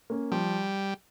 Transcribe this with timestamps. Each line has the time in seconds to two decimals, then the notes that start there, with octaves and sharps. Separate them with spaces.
0.10 A#3 C#4
0.32 F3 G3